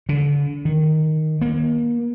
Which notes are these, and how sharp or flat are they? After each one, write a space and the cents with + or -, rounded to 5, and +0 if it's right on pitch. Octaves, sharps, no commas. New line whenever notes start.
D3 -35
D#3 +0
A#3 +35